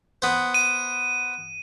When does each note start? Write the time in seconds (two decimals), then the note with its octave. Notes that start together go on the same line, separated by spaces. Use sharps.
0.22 B3 C5
0.54 D#7